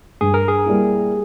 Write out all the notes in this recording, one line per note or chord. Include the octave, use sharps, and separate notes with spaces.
G2 G#4
A#4
G#4
G3 A#3 E4